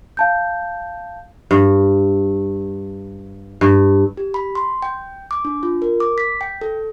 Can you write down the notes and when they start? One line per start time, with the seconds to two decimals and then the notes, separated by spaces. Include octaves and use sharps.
0.17 F5 A5 G6
1.51 G2
3.61 G2
4.17 G4
4.34 B5
4.55 C6
4.82 G5
5.31 D6
5.45 D4
5.63 F4
5.82 A#4
6.00 D6
6.18 B6
6.41 G5
6.61 A4